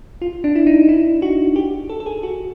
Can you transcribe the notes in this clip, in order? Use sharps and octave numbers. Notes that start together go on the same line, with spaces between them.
F4
D4
E4
D#4
E4
F#4
G4
A4
A4
G#4
F#4